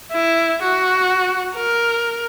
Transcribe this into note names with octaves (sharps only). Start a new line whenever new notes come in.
E4
F#4
A#4